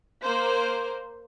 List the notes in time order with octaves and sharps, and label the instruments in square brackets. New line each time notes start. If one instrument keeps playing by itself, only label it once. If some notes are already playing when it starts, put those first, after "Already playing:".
[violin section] A#3 C5